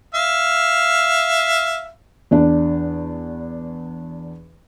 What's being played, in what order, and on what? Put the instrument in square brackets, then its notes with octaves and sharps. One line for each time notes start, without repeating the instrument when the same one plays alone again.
[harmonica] E5 F5
[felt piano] E2 D4